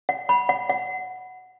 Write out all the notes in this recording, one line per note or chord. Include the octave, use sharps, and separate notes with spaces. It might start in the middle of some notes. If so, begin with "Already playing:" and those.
F#5
B5
F#5
F#5